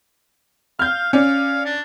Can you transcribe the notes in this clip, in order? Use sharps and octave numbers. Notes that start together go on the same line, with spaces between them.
F5 F6 G6
C#4 D5 F5
D4